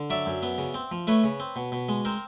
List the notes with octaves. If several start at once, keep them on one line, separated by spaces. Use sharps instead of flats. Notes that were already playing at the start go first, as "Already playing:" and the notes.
Already playing: D3
F#3 D5 E5
F#2
B3
C#3
C4
F3
A3 B4 C#5
C#3
C4
B2
B2
G#3
C4 A#4 C5